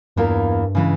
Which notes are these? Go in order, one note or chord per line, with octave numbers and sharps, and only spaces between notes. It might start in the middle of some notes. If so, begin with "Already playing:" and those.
E2 G2 E3 A#3 F4 A#4
C#3 E3 G#3